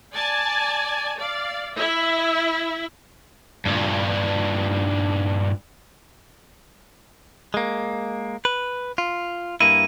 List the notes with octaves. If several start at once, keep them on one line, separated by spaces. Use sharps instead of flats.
D5 G#5 A5
D5 F5
E4 E5
G2 A#2
G#3 A#3
B4
F4
G2 A#3 E4 D#7